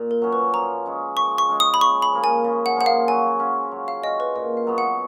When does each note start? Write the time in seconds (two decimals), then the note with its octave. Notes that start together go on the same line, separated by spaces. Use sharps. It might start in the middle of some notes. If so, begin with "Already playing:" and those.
Already playing: A#2
0.11 A#4
0.22 F#3 C#4
0.33 B4
0.53 F3 A#5
0.86 G#3 C#4
1.17 F3 C#6
1.38 C#6
1.49 G#3 C#4
1.60 D#6
1.74 B5
1.81 C#3 C#6
2.02 B5
2.12 F3 A#3 F4
2.24 G#5
2.44 C#3
2.66 F#5
2.76 F3 A#3 F4 F#5
2.86 F5
3.08 F#3 G#5
3.40 C#4 F4
3.72 F#3
3.88 F5
4.04 C#4 F4 D#5
4.20 B4
4.35 A#2 D#5
4.57 F5
4.67 F#3 B3
4.78 F#5